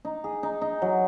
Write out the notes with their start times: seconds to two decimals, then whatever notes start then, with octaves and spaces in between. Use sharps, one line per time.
0.05 D#4
0.24 G#4
0.43 D#4
0.61 D#4
0.82 F#3